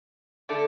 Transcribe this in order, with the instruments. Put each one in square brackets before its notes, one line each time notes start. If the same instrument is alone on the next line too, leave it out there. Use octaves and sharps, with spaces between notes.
[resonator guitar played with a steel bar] D3 A3 D4 A4